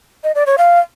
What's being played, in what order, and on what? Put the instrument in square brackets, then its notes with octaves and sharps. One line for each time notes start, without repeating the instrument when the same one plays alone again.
[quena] D#5
D5
C#5
F5